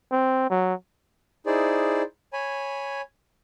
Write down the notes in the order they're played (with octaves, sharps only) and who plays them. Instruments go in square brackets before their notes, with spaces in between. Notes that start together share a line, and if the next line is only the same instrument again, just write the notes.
[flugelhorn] C4
F#3
[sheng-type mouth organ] D#4 E4 G#4 C5 D5
C#5 G#5 B5